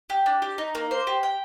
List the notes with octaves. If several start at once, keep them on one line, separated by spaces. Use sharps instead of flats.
G4
D4
G4
D#4
A#3
C5
G4
G5